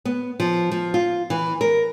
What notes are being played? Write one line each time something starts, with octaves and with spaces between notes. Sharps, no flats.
B3
F3
F3
F4
E3
A#4